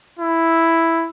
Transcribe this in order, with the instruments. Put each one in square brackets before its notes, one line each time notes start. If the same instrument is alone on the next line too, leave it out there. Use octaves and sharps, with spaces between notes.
[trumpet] E4